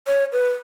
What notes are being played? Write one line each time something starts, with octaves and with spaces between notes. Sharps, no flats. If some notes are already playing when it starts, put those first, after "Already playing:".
C#5
B4